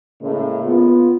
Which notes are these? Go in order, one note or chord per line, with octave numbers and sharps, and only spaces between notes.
A2 C#3 G#3 A#3
B3 F4